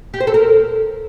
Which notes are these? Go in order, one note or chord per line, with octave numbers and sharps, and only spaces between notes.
G4
C5
A4
A#4